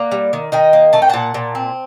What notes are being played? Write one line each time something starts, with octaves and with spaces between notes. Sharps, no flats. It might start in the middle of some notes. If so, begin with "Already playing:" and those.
Already playing: A#3 D5 F#5
G3
D#3
D#3 D#5 G5
A#3
A3 A5
G5
A#2 F#5 A5
A#2
C4